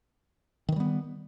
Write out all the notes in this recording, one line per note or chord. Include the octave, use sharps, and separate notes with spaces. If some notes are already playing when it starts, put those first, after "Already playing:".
D#3 E3 G3 B3